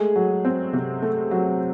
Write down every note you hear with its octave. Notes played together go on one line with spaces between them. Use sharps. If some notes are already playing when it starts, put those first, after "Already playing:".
Already playing: G#3 A3 G#4
F#3
C4
C3
A3
F#3